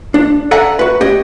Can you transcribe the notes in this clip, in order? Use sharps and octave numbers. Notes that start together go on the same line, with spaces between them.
D4
A4 D5 E5 F#5 G#5 A#5
F#4 B4
C#4 G4 D#5